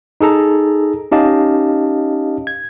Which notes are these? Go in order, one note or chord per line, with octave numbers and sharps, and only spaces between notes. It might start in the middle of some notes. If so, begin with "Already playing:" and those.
D#4 G#4 A4 A#5
C#4 D#4 G4 D#5 F5 A5
G#6